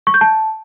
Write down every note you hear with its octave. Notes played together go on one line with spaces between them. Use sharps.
C#6
G6
A5